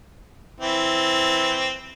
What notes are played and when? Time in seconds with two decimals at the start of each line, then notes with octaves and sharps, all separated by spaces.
0.60 E3 C4